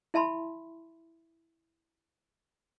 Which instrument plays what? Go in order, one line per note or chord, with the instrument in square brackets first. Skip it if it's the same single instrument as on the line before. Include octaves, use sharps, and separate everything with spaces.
[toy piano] E4 E5 A5 B5 C6